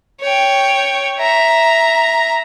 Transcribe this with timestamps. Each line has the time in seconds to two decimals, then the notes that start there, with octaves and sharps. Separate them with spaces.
0.21 C#5 G5
1.19 E5 A#5